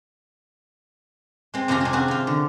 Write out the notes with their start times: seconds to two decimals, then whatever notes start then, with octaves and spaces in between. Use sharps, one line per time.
1.54 G#3 C4
1.68 F2 C3 C#4 F4 A#5
1.81 C3 G#3
1.93 F3 C4 F#4 G#4 C5
2.08 C3 F4
2.27 D3